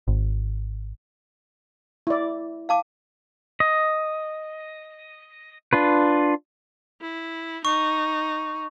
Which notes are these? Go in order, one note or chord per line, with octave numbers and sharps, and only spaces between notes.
G#1
E4 D5
F5 A5 D6
D#5
D4 F4 B4
E4
D#4 C#6